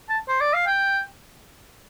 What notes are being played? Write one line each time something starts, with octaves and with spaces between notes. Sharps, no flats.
A5
C5
D5
F5
G5